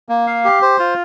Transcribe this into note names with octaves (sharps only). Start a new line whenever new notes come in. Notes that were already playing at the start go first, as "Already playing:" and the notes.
A#3
F5
G4
C5
F4